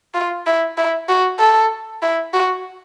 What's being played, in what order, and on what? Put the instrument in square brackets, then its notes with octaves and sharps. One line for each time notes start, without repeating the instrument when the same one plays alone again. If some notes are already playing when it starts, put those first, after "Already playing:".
[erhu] F4
E4
E4
F#4
A4
E4
F#4